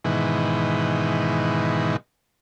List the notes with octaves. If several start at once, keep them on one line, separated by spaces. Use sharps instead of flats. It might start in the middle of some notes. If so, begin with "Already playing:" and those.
G#2 B2 D#3 E3